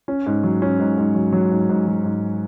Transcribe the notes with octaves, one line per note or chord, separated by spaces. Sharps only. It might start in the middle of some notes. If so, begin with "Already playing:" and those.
C#4
G#2
F#3
C#4
G#2
G#2
F#3
F#3
G#2
G#2
F#3
G#2